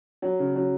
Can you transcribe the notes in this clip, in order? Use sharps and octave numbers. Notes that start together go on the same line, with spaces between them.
F#3
C#3
F#3